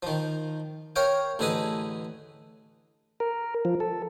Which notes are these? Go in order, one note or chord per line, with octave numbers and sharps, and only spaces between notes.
D#3 F3
A#4 C#5 F5 G5
A1 D3 E4 G#4 B4 D#5
A#4
F3
A4